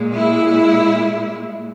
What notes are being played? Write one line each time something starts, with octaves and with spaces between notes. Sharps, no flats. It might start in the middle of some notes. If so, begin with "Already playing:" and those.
Already playing: A#2 G#3
E4